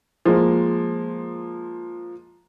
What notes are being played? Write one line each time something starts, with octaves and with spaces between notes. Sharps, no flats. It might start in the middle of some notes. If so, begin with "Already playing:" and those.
F3 G#3 A#3